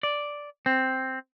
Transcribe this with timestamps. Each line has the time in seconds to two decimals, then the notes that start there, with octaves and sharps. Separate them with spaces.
0.03 D5
0.66 C4